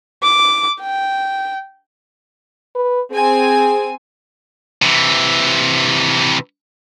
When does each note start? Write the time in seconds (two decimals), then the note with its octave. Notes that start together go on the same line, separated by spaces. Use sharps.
0.23 D6
0.81 G5
2.76 B4
3.12 C4 G#4 G#5
4.82 C3 E3